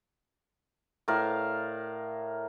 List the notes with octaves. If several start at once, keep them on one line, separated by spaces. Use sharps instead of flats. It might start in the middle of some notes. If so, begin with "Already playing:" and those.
A2 A#4 D5 F5